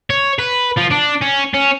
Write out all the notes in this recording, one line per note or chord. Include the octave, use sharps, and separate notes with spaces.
C#5
B4
F3
D4
C#4
C#4